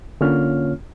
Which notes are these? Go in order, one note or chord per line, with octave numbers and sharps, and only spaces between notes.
D3 A#3 C#4 F4 C#5 F6